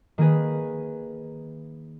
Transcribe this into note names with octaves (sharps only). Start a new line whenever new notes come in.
D#3 A#3 G#4 B4